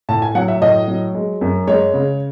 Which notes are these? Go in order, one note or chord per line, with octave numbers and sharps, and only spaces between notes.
A2 A5
G#5
F#3 F#5
E5
A2 D#5
F#3
G#3
F#2
G#3 C#5
C#3